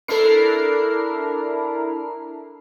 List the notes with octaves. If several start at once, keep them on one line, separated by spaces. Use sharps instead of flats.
D4 E4 A4 A#4 C7